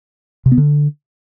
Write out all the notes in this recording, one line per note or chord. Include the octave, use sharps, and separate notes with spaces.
C3
B3
D3